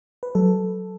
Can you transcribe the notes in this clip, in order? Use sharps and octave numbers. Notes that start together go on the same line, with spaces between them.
B4
F#3 A4